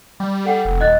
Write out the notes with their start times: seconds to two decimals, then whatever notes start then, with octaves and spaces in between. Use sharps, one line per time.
0.20 G3
0.45 A4 F#5 G5
0.65 F1
0.81 D#1 D#5 F#6 A6